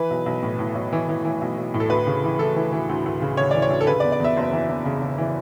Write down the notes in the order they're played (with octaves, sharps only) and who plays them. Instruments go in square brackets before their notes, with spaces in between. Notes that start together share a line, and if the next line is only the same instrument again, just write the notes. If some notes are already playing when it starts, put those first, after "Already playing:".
Already playing: [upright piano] E3 B4
B1
B1
A2
A2
B1
E3
E3
E3
B1
B1
A2
A4
D2 B4
C#3
E3
E3 A4
E3
E3
D2
D2
C#3
C#3 C#5
E3 D5
C#5
D2
A4
C#3 B4
D5
E2
D5
E2 E5
F#1
E3
E2
C#3
C#3
E3